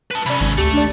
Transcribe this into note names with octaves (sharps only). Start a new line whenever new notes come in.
B4 A5
C3 C#4 D5 B5
G#1
D2 A3 G4
D4 D5